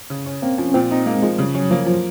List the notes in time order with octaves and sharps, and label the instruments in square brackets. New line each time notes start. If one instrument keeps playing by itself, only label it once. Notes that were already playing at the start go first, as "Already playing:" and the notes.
[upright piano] C#3
C#4
[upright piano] A#3 [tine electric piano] C4
[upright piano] F3 [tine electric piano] C#4
[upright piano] A#2 [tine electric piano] C4
[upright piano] D#4
[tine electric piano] G#3 [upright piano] A#3
[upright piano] F3 [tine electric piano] G#3
[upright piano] C#3 [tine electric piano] G3
[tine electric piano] F#3 [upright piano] C#4
[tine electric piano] F3 [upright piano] A#3
[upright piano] F3